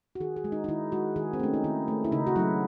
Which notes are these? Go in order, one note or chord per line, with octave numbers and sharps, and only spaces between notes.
F#4
D#3 G#4
G#4
G#3
D#4
D#4
D#3 E4
G#3 F#4
D#3 G#4
C4
A3 C#4
D#4
D#3 E4
A3
E4
C#3 D#4
F#4
F#3 A3 E4